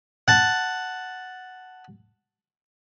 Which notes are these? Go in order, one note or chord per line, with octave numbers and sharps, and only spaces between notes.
F#5 A5